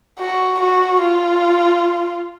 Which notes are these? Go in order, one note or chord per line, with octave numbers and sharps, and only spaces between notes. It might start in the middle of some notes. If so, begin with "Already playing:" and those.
F#4
F#4
F4